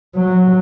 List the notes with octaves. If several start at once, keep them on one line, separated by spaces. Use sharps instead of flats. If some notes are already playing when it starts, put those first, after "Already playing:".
F#3